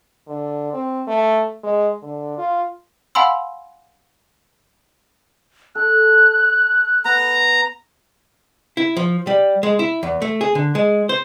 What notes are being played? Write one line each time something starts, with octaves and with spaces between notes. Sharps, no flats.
D3
C4
A3
G#3
D3
F4
F5 F#5 G#5 B5 C6 E6
A4 F#6
B3 A#5
E4
F3
G3
G#3
E4
E2
A3
G#4
D3
G#3
C5